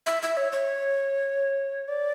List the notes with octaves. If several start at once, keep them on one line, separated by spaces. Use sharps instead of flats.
E5
E5
C#5
C#5
D5